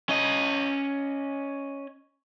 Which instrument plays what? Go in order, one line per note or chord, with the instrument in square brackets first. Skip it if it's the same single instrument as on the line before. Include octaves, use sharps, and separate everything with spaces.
[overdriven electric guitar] C#4 D#5